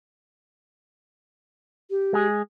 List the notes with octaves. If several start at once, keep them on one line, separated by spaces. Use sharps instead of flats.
G4
G#3 G#4